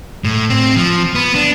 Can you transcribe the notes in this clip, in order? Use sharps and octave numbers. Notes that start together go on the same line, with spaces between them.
A2
C4
F3
B3
D4